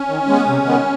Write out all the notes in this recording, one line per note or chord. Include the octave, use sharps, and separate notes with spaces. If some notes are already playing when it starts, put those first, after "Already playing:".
Already playing: C#4
D#3
G#3 B3
C3
D#3 G#3 B3